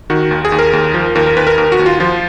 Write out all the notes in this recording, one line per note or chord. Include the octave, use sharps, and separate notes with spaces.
D#3 F#4
D#2
G#4
D#2
A#4
D#2
F3
D#2 A#4
A#4
D#2 B4
A#4
D#2 A#4
F#4
D#2
F4
F3 F4